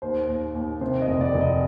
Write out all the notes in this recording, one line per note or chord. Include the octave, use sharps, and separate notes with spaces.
D#2 C5
D#2
D#2
C3 C5
D#5
F1
D5
F1
D#5